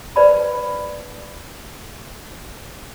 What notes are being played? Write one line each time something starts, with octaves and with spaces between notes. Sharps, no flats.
B4 C5 D5 A5 B5